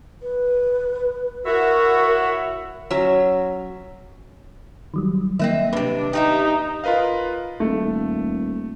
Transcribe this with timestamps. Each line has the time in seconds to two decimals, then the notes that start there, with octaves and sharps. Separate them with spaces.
0.22 B4
1.46 E4 F#4 A#4 C#5 E5
2.91 F#3 C#4 E5
4.94 D#3 F#3 G3
5.39 D#3 A#3 C4 D#5 E5
5.73 A2 C3 D4 B4
6.13 D#4 G4 G#4 E5
6.84 F4 A#4 B4 D#5 F5
7.60 D#1 A3